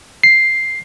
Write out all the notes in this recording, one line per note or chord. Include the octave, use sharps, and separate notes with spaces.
C7